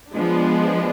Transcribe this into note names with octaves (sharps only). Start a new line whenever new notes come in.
F3 G#3 B3 D4